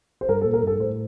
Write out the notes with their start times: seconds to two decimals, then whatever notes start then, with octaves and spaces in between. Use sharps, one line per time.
0.21 C5
0.29 G2 A#4
0.41 A4
0.45 A#2
0.53 A#4
0.63 G2 A4
0.79 A2 C5